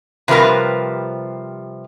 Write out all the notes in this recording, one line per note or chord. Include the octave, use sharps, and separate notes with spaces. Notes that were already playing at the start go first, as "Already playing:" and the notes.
C3 F3 G3 A#4 B4